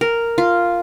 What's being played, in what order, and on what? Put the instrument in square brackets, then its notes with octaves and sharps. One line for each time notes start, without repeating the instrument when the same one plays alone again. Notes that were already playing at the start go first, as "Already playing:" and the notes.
[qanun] A#4
F4